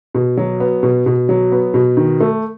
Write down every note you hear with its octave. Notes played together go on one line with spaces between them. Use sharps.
B2
F#3
B3
B2
B2
F#3
B3
B2
D#3
A3